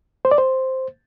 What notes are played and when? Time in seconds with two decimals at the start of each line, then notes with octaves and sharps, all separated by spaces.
0.25 C5
0.31 D5
0.38 C5